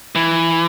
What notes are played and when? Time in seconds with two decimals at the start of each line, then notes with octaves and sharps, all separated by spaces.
0.15 E3